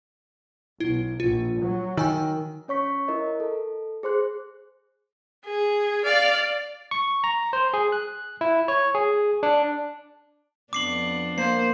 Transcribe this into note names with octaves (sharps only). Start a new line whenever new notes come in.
B1 E4
A#1 F4
F#3
D#3 G5 G#5 E6
C#4 C#5 C#6 B6
E4 A#4 D#5
A4
G#4 C5 C6 F#6
G#4
D5 F5
C#6
A#5
C5
G#4
F#6
E4
C#5
G#4
D4
F2 B3 D4 D6 C7 F#7
A#3 C5 C7